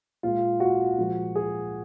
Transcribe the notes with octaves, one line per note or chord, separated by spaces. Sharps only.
A#2 G#3 F4
F#4
A#2 F3 G#3
G#4